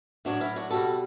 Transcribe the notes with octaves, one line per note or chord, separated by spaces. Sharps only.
A2 F#3 D4 F#4
C#4 E4
D4 F#4
B2 G3 F#4 A4